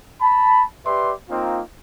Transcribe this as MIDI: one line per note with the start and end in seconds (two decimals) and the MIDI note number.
0.21 0.62 81
0.21 0.62 83
0.86 1.12 67
0.86 1.12 71
0.86 1.12 74
0.86 1.12 76
0.86 1.12 84
1.29 1.60 58
1.29 1.60 60
1.29 1.60 63
1.29 1.60 65